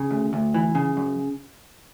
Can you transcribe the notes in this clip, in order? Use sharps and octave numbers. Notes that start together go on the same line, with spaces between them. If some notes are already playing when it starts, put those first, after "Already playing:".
Already playing: C#3
D2
D2
E3
C#3
F#2